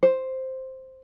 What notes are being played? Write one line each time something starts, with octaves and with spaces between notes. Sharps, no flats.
C5